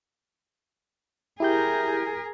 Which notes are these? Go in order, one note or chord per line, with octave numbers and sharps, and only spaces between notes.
E4 G4 G#4 A#4 G6